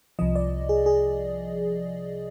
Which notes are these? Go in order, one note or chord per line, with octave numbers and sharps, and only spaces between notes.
C2 C3 F3 D#5
D5
G#4
G#4